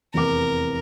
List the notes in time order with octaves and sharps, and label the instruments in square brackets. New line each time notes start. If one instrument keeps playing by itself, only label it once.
[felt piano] F1 E2 D6 [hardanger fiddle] A#4